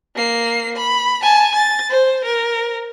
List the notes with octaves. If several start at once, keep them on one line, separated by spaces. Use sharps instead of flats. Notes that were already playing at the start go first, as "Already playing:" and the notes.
A#3 C7
B5
G#5 A5
A6
C5
A#4